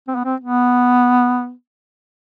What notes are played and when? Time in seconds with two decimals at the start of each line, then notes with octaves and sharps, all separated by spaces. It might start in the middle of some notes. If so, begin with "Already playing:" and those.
0.08 C4
0.16 B3
0.25 C4
0.40 B3